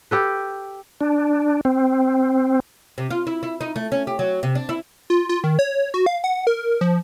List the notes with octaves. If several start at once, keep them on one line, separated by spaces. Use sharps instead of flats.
G4 A4 B4
D4
C4
C3
F4
E4
E4
D#4
A3
C#4
G4
F#3
C3
D4
E4
F4
F4
D#3
C#5
F#4
F5
F#5
A#4
F3